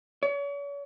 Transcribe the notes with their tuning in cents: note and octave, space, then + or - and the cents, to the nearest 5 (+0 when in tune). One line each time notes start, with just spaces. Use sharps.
C#5 +40